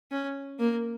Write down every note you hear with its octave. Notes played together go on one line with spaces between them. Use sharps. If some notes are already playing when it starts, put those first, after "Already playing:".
C#4
A#3